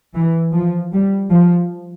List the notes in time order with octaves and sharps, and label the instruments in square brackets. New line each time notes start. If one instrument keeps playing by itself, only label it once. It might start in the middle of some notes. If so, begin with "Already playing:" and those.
[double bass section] E3
F3
G3
F3